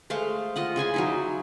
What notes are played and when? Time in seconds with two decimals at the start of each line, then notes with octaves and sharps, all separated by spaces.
0.10 G#3 A3 C5 F5
0.56 F4 D#5 F#5
0.76 C#3 G#4 G#5 C6
0.94 F#3 D#4 E4